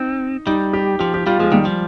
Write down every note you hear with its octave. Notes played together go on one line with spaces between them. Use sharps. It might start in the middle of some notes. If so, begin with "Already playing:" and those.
Already playing: C4 D#4
G3 D#4
G4
F3 G4
G4
G3 F4
F3 G#3
D#3 G3
F3